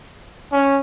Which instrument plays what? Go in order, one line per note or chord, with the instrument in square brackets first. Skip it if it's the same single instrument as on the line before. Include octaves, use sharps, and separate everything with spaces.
[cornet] C#4